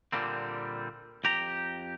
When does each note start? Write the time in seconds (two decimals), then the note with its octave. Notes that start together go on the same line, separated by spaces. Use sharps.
0.12 A#2 D3 G3 A#3 C4
1.24 F2 G4 A#5